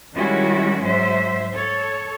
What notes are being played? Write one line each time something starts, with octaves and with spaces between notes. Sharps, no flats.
D#3 G3 G#3 C#4 E4 F#4
G#2 F#3 C5 E5
A4 C#5